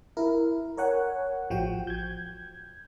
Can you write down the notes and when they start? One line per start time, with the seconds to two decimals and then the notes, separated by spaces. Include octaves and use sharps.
0.17 E4 A#4
0.77 A#4 C#5 F#5 G#5
1.50 A1 F3 F#4 G5
1.87 G6 G#6